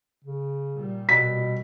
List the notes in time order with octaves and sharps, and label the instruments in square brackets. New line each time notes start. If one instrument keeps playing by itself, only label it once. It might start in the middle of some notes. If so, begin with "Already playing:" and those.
[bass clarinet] C#3
[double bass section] A#2 G3
[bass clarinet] B2 [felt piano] B6